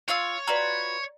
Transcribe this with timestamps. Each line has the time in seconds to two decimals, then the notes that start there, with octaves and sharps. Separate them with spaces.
0.08 F4 C#5 F5 E6
0.47 F4 F#4 B4 D5 A#5